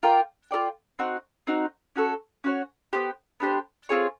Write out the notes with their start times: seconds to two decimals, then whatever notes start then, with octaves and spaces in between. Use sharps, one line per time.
0.03 F4 A#4 D5 G5
0.51 F4 A#4 D5 G5
0.99 C4 D#4 F#4
1.47 C4 D#4 F#4
1.96 C#4 F#4 A4 C#5
2.44 C#4 F#4 A4 C#5
2.93 B3 D4 G4 C5
3.40 B3 D4 G4 C5
3.89 C4 F4 G#4 C#5